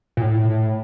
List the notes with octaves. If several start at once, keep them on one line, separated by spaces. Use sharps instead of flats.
A#2
A2